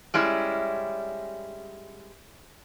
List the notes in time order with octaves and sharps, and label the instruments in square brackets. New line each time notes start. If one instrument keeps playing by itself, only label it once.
[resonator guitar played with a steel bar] G3 G#3 C#4 E4